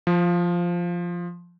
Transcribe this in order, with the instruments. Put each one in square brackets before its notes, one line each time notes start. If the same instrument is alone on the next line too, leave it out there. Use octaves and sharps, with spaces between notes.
[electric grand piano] F3